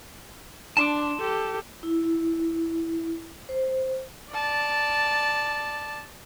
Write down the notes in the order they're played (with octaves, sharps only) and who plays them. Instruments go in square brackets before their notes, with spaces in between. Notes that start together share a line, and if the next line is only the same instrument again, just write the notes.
[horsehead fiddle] D4 [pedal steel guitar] A5 C6 D6
[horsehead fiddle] G4 A4
[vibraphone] E4
C5
[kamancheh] D5 A5